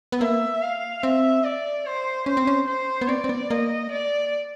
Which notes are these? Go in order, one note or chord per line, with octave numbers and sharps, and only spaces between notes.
B3
A#3 E5
F5
C4 E5
D5
C5
C#4 C5
C4
C#4
C5
B3
C4 D5
C4
B3
A#3 D#5
D5